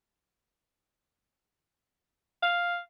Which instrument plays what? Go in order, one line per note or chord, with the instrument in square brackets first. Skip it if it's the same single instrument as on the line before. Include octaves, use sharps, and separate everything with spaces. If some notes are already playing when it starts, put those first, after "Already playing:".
[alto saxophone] F5